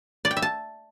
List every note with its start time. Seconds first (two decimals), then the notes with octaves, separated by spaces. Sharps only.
0.25 D5
0.31 G5
0.37 E5
0.42 A5